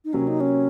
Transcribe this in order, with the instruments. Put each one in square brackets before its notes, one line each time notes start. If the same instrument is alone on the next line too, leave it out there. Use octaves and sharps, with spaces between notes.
[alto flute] D#4
[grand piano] C3 F#3 A#3 [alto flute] C#4
[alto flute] D#4
C#4